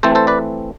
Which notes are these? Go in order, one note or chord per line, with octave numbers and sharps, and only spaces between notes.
E3 A3 C4 A4 C5
A4 C5
B4 D5